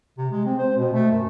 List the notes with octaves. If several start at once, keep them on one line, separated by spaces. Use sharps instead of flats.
C3
G#3
C4
C5
B2
A3
F#2